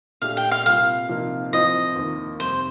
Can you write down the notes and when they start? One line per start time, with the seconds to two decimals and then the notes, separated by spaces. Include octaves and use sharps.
0.22 A#2 A3 D4 G4 F5
0.37 G5
0.51 F5
0.65 C3 G3 A#3 F4 F5
1.09 C3 F3 A#3 D#4
1.52 A2 F3 C4 F4 D#5
1.96 D#2 D#3 A#3
2.39 F2 C3 G3 C5